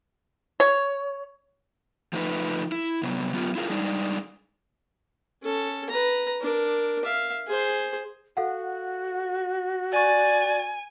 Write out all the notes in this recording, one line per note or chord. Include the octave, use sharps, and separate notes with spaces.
C#5
F3 A3 D#4 A#4 B4
E4
C3 F#3 B3
F#3 B3 F4 G4
E4 F4 G#4 A#4
G3 G#3 D4 D#4
C#4 A4
B4 A#5
D4 A#4
E5 F5
G#4 C5
F#4 A4 F5 F#5
D5 G#5 C#6 A6